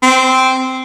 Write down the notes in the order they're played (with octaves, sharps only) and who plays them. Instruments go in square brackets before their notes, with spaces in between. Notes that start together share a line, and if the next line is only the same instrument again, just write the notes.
[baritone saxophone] C4